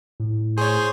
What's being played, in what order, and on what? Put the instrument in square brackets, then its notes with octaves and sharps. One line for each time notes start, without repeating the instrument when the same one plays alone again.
[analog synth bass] A2
[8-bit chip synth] G#4 C#5 [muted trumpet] C5